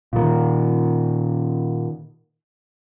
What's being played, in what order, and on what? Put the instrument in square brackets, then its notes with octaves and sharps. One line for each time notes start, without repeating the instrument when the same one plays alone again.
[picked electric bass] A#2 D#3